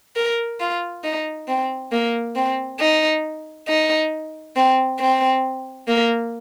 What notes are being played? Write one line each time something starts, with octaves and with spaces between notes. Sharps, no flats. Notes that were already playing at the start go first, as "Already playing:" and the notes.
A#4
F4
D#4
C4
A#3
C4
D#4
D#4
C4
C4
A#3